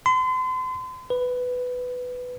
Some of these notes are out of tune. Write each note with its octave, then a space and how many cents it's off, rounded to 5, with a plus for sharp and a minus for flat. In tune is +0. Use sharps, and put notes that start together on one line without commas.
C6 -40
B4 +10